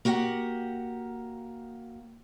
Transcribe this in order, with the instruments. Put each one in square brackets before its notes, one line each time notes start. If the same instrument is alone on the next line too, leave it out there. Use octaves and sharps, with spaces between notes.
[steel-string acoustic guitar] A#3 F#4 G4 F#5